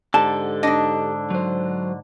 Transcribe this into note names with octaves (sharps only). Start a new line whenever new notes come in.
G#2 D3 G4 A4 A5
D4 D#4 D#5
F#3 C5